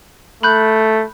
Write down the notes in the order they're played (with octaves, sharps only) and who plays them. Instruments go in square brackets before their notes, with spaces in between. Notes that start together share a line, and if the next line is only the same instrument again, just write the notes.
[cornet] A3 [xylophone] B5 F#6 G6